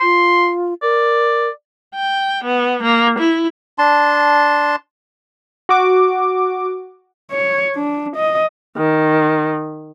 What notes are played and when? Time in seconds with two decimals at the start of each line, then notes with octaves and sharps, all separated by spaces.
0.01 F4 C6
0.82 A#4 D5
1.95 G5
2.44 B3
2.83 A#3
3.19 E4
3.78 D4 A5 C6
5.69 F#4 D6
7.32 C#5
7.76 D4
8.16 D#5
8.77 D#3